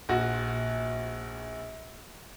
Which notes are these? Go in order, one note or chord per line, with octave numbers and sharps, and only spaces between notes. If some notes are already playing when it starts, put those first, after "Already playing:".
A#1 F#4